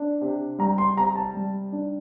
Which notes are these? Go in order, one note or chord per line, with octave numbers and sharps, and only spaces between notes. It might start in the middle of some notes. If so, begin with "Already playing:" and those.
Already playing: D4
C3
G3 A#5
C6
C3 A#5
A5
G3
D4